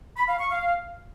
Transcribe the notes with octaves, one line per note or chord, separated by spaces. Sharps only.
B5
F5
C#6
F5